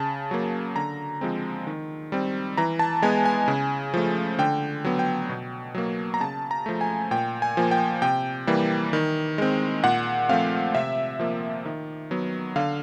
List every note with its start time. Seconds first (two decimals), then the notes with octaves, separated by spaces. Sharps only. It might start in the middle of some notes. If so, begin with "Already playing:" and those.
Already playing: C#3 A5
0.31 F#3 A#3
0.76 D3 A#5
1.21 F3 G#3 C4
1.67 D#3
2.12 G3 C4
2.57 E3 A#5
2.79 A5
3.02 G#3 B3 G#5
3.25 G#5
3.48 C#3
3.94 F3 A3
4.39 D3 G5
4.84 F#3 B3
4.99 G5
5.29 B2
5.74 F#3 A#3
6.14 A#5
6.20 C#3 A5
6.51 A#5
6.66 F3 A3
6.81 G#5
7.11 A#2 G5
7.42 G#5
7.57 F3 A#3
7.71 G5
8.02 C3 G5
8.47 E3 G3 A#3
8.93 D#3
9.38 G#3 C4
9.84 A#2 F#5
10.29 F3 A3 C4 F5
10.75 C3 E5
11.20 F3 A#3
11.65 D#3
12.11 F#3 B3
12.56 D3 F5